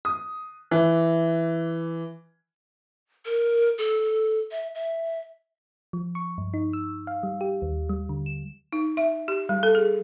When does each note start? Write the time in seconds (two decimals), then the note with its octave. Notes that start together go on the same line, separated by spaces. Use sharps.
0.05 D#6
0.71 E3
3.25 A#4
3.78 A4
4.51 E5
4.75 E5
5.93 F3
6.15 C#6
6.38 G2
6.54 D#4
6.73 E6
7.07 F5
7.23 G3
7.41 G4
7.62 D#2
7.89 G3
8.09 D3
8.26 E7
8.73 D#4
8.97 E5
9.28 G4
9.49 G3
9.63 A4
9.75 G#4